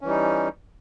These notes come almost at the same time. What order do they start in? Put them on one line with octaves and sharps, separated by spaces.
C#4 E3 G3 D#4